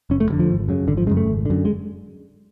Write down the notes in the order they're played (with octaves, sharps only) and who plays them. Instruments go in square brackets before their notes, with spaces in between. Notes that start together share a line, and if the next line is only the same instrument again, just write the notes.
[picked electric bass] F#1 C#4
A3
F2 F#3
D3
F3
G#1
F#2 C#3
G#1 D3
F3
C#3 G#3
F#2
A3
G#1
F#2 D3
G#3